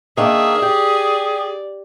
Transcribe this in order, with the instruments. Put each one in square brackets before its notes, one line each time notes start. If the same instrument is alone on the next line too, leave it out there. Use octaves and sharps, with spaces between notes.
[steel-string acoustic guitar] D#3 A#3 D4 [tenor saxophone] G#4 [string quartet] E5
[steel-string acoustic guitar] G4 [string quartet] D5